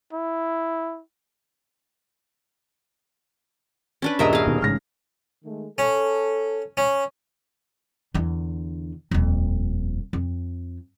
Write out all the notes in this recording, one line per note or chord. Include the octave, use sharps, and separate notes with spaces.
E4
C#4 D4 B4
D#1 G2 G#4 A#4 D#5 E5
G#4 F5
B2 D#3
A1 G#2 C#3 F6 A#6
D#3 G#3 A3
C#4 A4
C#4
E2 D3
D#1 F2
F2